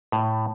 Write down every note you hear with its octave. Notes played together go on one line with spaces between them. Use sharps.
A2